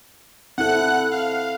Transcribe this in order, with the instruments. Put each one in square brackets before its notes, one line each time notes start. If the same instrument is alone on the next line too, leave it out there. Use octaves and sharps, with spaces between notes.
[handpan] C4 E4 A4 [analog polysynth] F#5 F#6
[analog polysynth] F5